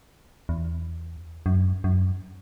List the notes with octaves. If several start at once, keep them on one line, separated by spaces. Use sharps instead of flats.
E2
F#2
F#2